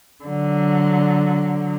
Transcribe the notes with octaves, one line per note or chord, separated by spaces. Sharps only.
D3 F#3